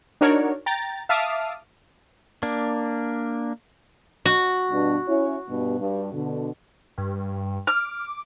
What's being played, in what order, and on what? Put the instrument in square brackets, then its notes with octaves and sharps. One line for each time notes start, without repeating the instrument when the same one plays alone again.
[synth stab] D4 D#4 F#4 A#4 C#5 D5
G5 A#5 A6
E5 F5 A5 D6 D#6 F6
[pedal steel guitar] A#3 D4
[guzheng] F#4
[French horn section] G2 B2 D4
C#4 E4 C#5
G2 B2
G2
B2 D3
[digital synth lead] G2
[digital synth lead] D6 [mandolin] F6